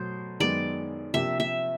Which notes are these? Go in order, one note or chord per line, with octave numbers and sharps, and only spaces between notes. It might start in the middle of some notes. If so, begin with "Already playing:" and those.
Already playing: B2 F#3 A3 C5
F#2 D#3 G#3 B3 D5
C3 F3 A#3 D4 G4 E5
E5